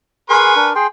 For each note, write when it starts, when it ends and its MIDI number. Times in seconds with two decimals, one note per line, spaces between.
0.30 0.55 68
0.30 0.55 70
0.30 0.69 71
0.30 0.69 80
0.30 0.55 84
0.30 0.69 85
0.56 0.73 62
0.56 0.73 70
0.75 0.87 68
0.75 0.87 79
0.75 0.87 84